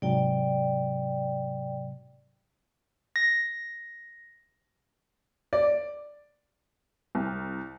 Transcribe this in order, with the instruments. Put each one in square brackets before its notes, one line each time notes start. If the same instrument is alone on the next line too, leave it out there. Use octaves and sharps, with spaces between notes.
[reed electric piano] G#2 C3 F#3 [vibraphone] D5 G5
[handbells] A#6
[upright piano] D5
[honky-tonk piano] C2